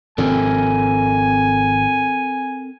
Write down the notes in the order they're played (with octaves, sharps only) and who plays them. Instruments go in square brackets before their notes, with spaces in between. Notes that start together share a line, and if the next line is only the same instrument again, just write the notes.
[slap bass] G#1 C3 F3 [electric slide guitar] C4 A4 A#4 [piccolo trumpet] G#5